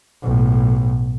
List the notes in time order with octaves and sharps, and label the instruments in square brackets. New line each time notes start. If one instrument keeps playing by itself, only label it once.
[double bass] B1 A2